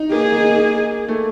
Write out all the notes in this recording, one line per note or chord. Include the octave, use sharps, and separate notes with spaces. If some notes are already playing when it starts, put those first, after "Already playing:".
Already playing: D#4
A#3 G#4
A3